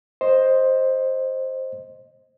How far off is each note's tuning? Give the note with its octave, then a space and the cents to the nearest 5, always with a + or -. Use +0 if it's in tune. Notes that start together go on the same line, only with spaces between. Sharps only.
C5 +10 D#5 +0